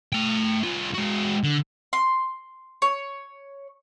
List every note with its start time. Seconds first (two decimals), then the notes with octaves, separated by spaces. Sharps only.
0.13 A3 G5
0.63 C2 F4
0.94 G#3 F#4
1.44 D3
1.93 C6
2.82 C#5